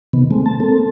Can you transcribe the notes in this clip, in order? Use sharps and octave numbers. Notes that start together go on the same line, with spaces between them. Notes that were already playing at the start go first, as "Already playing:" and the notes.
C3 D#3 B3
G#3 A3 C4
A5
A#3 C4 A4